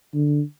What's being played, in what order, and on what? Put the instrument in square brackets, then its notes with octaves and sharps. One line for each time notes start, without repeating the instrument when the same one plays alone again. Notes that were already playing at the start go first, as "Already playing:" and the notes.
[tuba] D3